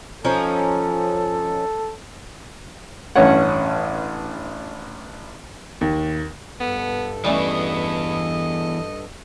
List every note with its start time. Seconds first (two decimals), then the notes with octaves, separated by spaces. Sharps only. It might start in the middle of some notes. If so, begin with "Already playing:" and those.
0.25 F3 C#4 D#4 A4
3.16 A1 G2 C#4 C#5 F#5
5.81 D#2
6.60 G2 B3 A4
7.25 E3 G3 A3 B3 C#4 D#5